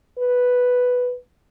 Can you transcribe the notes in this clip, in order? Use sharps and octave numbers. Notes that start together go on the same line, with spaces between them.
B4